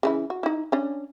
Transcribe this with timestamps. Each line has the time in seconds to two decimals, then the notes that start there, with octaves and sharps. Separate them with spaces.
0.03 C#3 E3 E4
0.30 F#4
0.43 D#4 E4
0.72 C#4 D4